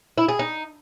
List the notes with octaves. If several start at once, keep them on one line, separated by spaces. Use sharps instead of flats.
E4
G#4
D#4